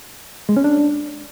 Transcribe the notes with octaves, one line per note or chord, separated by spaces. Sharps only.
G#3
C#4
D4